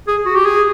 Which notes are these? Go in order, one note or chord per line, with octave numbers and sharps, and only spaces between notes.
G#4
F#4
G4
G#4